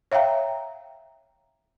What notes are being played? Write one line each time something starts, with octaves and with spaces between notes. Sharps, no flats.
C#5 E5 F5 G5 A#5